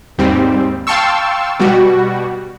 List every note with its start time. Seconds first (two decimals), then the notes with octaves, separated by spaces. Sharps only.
0.18 D#2 G#2 G3 C4
0.87 F5 G5 A5 C6 C#6 E6
1.59 B2 G3 F#4